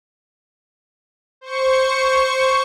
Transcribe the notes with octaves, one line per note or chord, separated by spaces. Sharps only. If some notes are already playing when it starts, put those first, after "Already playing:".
C5 C#6 C#7